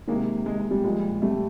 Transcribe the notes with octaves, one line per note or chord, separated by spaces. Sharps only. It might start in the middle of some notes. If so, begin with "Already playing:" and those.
C3 D#3 G#3 A#3
G#3
G#3
G3
A#2 F3 G#3
G3 A3